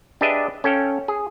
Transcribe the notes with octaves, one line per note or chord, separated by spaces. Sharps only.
D4 G4 G#4 B4 D#5 E5
C#4 A4 F5 G5
G#4